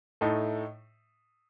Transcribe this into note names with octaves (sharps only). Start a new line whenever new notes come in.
A2 A3 D#4